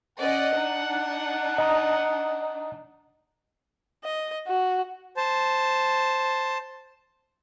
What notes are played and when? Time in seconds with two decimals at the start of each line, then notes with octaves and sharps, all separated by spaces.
0.19 C#4 D5 D#5 F#5
0.52 D4 D#4
1.58 D#5 A#5 D#6
4.04 D#5
4.48 F#4
5.17 C5 A5